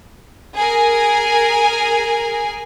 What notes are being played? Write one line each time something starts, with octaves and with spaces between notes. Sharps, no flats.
G#4 A#4 G#5